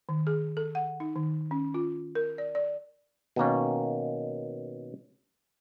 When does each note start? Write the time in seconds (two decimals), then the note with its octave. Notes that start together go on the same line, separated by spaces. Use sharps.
0.09 D#3
0.27 G#4
0.57 A4
0.75 F#5
1.00 D#4
1.16 D#3
1.51 C#4
1.74 F4
2.15 A#4
2.38 D5
2.55 D5
3.36 B2 D#3 A#3 C#4